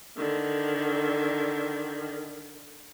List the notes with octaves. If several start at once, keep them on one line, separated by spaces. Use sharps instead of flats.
D3 D#3